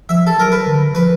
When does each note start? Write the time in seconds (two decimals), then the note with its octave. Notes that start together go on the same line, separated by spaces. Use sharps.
0.09 F3 E5
0.27 A4
0.38 F#3 A#4
0.52 B4
0.67 D3
0.95 F3 B4